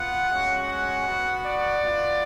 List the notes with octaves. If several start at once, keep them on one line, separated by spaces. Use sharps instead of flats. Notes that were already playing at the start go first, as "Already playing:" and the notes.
Already playing: B3 F4 F#5
G#3 C#4 F#4
F#5
B3 F#4
D5
B3 F4